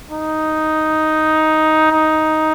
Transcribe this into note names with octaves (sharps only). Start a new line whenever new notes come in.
D#4
D#4